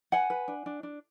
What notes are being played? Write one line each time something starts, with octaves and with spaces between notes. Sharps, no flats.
B4 F#5 G#5
B4
D4
D4
D4